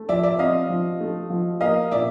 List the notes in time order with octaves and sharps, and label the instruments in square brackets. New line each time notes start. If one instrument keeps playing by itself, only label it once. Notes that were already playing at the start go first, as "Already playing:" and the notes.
Already playing: [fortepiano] A3
[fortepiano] F3 [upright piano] D5 E5
[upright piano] D5 E5
[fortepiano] C4 [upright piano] D#5 F5
[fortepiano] F3
A3
F3
[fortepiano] A#3 [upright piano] D#5 F5
[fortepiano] A#2 [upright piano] D5 E5